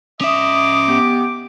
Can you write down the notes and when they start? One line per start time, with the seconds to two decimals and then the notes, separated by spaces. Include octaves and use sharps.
0.21 C#4 D#5 E5 D6 D#6
0.88 B3 G4